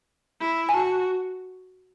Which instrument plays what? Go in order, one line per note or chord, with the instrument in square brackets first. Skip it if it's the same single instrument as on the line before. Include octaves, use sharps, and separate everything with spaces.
[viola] E4
[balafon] G#5
[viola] F#4 [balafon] A5